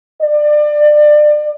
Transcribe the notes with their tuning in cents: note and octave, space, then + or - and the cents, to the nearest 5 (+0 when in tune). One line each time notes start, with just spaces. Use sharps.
D5 +25